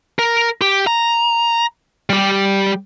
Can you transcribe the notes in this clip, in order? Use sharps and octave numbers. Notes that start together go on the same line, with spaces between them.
A#4
G4
A#5
G3 G4